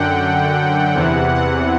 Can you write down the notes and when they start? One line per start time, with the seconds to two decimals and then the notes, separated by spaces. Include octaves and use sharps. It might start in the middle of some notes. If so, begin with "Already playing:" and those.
Already playing: F#2 D3 F#5 G5
0.94 E2 C3 E3
1.35 F#5